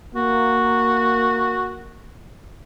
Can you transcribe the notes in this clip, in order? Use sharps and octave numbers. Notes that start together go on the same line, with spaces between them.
A#3 F#4